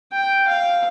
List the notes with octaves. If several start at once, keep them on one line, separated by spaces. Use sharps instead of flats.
G5
F5